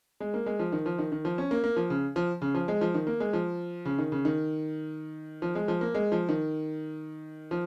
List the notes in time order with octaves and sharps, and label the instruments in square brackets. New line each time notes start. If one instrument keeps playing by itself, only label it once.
[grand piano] G#3
A#3
G#3
F3
D#3
F3
D#3
D#3
F3
C#4
A#3
A#3
F3
C#3
F3
C#3
F3
G#3
F3
D#3
A#3
G#3
F3
C#3
D#3
C#3
D#3
F3
G#3
F3
A#3
G#3
F3
D#3
F3